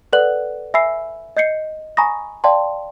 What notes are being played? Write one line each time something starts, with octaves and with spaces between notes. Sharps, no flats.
A4 B4 D5 F#5 F#6 F#7
E5 G#5 B5 E6 C7
D#5 G6 C7 C#7
G#5 A#5 B5 C#6 D#6 A#6
D5 F5 G5 A5 C6